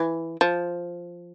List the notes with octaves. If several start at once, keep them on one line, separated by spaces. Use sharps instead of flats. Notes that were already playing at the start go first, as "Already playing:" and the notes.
Already playing: E3
F3